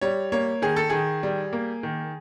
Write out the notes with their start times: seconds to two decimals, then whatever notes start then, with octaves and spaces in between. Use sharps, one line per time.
0.01 G3 C#5
0.32 A#3 C#5
0.62 D#3 G#4
0.76 A4
0.90 D#3 G#4
1.23 G3
1.53 A#3
1.83 D#3